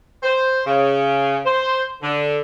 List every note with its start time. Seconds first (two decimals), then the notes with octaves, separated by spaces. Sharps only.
0.23 C5
0.66 C#3
1.46 C5
2.02 D3